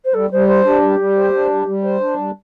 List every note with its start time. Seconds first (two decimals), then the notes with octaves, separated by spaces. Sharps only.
0.04 C5
0.13 G3 A4
0.30 G3 C5
0.47 C5
0.64 D4 G4
0.82 G3
0.98 G3
1.16 C5
1.33 D4
1.50 G3
1.66 G3
1.83 C5
2.00 D4
2.17 G3